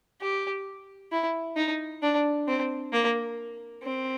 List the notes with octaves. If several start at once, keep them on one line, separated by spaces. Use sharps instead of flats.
G4
E4
D#4
D4
C4
A#3
C4